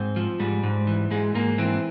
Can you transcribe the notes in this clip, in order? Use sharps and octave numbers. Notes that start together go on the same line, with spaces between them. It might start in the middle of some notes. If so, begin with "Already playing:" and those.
Already playing: G#2 C4
F3
G#2 G3
G#2
E3
G#2 G#3
G#2 A#3
E3 C4